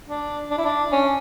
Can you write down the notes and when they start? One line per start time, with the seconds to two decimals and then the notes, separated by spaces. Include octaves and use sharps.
0.09 D4
0.51 D4
0.58 E4
0.65 D4
0.92 C#4